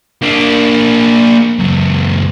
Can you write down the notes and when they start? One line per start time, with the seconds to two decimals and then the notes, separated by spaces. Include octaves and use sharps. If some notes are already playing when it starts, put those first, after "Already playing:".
0.22 A#3 D4
1.59 C#2 F#2